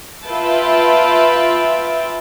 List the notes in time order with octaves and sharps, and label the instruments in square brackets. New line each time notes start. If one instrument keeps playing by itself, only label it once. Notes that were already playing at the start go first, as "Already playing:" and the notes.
[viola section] F4 B4 E5 G5 A5